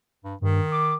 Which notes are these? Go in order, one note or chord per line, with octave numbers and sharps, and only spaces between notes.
G2
G2 D#3
D6